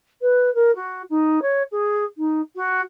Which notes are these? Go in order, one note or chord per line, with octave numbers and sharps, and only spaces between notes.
B4
A#4
F#4
D#4
C#5
G#4
D#4
F#4